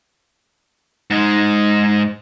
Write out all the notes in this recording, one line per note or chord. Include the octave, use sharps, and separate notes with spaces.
G#2 G#3